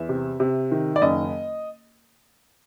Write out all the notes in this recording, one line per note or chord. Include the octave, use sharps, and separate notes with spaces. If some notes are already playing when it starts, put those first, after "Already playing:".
Already playing: E2 E5
C3
C3
D#3
D5
F#1 D#5